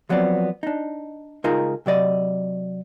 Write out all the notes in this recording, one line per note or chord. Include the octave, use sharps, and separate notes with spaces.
F3 F#3 B3 C4 D5
D4 D#4
C#2 D#4 F4 G#4 A#4 A#5
C3 F#3 D5 D#5